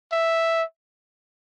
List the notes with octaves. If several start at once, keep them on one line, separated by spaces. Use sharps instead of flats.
E5